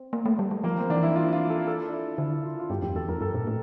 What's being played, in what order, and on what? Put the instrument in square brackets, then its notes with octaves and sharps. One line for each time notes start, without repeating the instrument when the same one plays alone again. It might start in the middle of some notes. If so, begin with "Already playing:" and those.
Already playing: [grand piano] C4
[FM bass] A#3
A3
G3
G3
[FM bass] F3 [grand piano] A#3
[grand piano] C4
[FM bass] E3 [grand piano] D4
[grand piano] E4
F4
F4
A4
A4
D4
E4
[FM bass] D3 [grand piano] E4
[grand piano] F4
F4
[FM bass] G2 [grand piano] G4
[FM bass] F2 [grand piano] G4
[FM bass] E2 [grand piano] A4
[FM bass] F2 [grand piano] A#4
[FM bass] G2 [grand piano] A4
[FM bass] A#2
A2